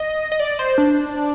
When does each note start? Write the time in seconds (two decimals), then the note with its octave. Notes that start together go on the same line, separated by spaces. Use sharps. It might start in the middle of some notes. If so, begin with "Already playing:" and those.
Already playing: D#5
0.32 D#5
0.40 D5
0.59 C5
0.78 D4